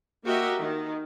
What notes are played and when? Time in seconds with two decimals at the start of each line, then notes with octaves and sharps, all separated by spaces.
0.24 A#3 F#4 G4 A#4 D#5 E5
0.59 D#3